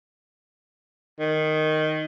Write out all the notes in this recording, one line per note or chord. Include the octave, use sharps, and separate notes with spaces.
D#3